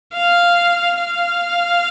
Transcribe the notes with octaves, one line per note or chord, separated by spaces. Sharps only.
F5
F5